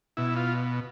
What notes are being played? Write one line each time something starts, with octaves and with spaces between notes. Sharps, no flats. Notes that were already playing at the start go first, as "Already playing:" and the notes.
B2 E4
F4